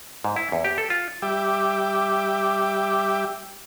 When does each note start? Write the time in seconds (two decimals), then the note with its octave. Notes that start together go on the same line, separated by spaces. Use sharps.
0.24 G#2
0.36 E4
0.52 E2
0.65 G4
0.78 A4
0.90 F4
1.22 G3 G4 E5 G5 D6